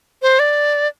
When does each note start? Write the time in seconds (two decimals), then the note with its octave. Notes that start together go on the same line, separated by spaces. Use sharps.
0.22 C5
0.39 D5